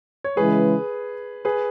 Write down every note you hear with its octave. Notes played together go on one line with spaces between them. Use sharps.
C#5
C#3 E3 G#3 G#4 B4
G#4 B4